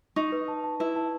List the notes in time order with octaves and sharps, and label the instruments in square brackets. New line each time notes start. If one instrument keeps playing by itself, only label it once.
[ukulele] D#4 [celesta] C#6
[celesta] B4
A5
A5
[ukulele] E4 [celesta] B4
[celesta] A5